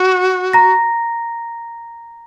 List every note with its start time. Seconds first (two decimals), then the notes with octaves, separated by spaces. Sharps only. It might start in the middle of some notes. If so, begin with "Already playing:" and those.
Already playing: F#4
0.53 A#5 A#6